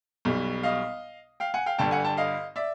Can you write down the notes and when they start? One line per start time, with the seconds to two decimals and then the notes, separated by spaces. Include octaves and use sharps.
0.25 B1 B2 G3
0.63 D#5 F5
1.40 F5 G5
1.54 F#5 G#5
1.66 F5 G5
1.78 G1 G2 D3 G5 A5
1.91 F#5 G#5
2.04 G5 A5
2.17 D#5 F5
2.56 D5 E5